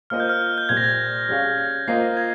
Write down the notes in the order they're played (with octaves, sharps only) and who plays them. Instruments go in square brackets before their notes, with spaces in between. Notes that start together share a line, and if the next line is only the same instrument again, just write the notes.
[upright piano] A#3 F4 C5 D#5 [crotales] F6
[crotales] G6
F6
G6
[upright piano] A#2 G3 C4 [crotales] G#6
[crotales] A#6
G#6
[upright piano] G3 C#4 G#4 C#5 F5
[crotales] A#6
[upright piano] A#3 F4 C5 D#5 [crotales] C7
[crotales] G#6